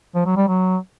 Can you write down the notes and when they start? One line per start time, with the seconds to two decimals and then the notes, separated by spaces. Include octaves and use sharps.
0.15 F3
0.26 F#3
0.37 G3
0.48 F#3